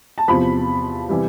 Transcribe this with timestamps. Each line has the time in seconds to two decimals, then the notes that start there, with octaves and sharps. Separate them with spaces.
0.18 A5
0.28 E2 C3 F3 B5
1.09 C3 E3 G3